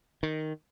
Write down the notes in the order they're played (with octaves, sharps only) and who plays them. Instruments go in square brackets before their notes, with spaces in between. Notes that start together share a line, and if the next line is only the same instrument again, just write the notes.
[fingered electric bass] D#3